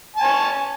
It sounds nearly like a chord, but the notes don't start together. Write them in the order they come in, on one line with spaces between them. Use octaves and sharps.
A5 G#5 C#5